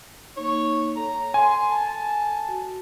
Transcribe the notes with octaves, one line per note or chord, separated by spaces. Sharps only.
A#3 D#4 C#5
A4 C#5 A#5
A4 G#5 C6
A5
F#4